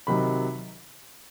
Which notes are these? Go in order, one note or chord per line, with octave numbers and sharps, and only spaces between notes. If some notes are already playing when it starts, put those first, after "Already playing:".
C3 D#3 F#3 B5